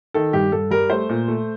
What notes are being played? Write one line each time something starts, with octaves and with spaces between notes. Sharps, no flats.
D#3 A4
G2 G4
G2 A4
G3 A#4
A3 C5
A#2
A3